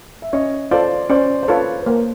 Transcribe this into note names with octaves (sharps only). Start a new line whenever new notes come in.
E5
C#4 C#5 D#5
F4 A4 C5 D5
C#4 C5 D5
C5
F4 A4 B4 C#5
B4
A#3 A#4 C5